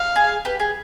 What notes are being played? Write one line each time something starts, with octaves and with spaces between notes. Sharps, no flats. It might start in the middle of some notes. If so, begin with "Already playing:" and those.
Already playing: F5
G#4
G4 B4
G#4